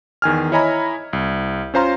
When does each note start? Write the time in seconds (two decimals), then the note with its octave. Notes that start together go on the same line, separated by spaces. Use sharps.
0.22 E2 D#3 G#5 F6
0.52 E4 C#5 D#5 G#5 A#5 B5
1.13 C2
1.74 C#4 F4 C5 F5 A#5 C6